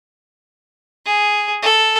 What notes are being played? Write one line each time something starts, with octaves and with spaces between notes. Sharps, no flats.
G#4
A4